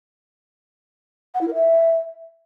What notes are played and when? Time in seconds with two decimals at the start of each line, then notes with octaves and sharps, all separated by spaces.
1.34 F#5
1.41 E4
1.48 A#4
1.55 E5